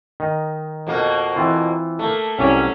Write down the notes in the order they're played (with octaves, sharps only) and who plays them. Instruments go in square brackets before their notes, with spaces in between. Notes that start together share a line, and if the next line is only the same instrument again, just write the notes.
[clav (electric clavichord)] D#3 D#4
[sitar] F2 B2 A#3
[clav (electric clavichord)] E3 C4 F4
[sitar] A3 A#3
[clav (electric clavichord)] C2 D5 [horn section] F#3 C#4